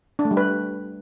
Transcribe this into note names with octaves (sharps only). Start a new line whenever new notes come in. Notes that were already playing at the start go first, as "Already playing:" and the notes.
D4
A3
G3
B4